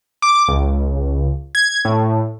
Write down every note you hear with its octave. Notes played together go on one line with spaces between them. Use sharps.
D6
C#2
G#6
A2